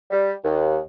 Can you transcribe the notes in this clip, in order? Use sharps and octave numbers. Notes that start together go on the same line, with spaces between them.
G3
D#2